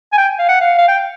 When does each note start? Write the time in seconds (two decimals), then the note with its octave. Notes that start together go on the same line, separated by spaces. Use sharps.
0.13 G#5
0.18 G5
0.39 F5
0.49 F#5
0.61 F5
0.78 F5
0.88 G5